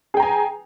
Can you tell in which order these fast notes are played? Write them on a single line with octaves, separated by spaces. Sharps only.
G#4 G5 A#5 G#5